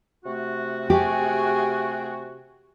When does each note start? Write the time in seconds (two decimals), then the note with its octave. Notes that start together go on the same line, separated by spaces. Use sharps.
0.25 C3 A3 F#4
0.90 G4 G#4 G5